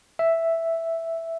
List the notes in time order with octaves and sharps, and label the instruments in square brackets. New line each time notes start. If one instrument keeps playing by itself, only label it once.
[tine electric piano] E5